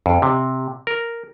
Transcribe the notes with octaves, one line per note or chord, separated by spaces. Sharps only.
F2
C3
A#4